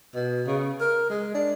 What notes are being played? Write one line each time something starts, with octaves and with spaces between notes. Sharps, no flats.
B2
C#3
A#4
G#3
D4